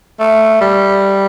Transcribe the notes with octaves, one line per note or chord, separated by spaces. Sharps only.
A3
G3